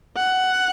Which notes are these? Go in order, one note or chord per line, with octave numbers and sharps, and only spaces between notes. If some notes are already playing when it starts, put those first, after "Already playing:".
F#5